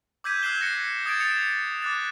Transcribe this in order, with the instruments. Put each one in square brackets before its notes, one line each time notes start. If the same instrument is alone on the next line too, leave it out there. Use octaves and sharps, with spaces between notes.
[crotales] D6 E6 G6 G#6 B6 D#7
E6 F#6 G#6 C7 E7 G7
A#6 C#7
D#6 G#6 A6 D7
A6 C#7 E7 F7
D6 F#6 A6